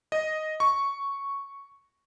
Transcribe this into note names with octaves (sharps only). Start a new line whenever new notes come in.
D#5
C#6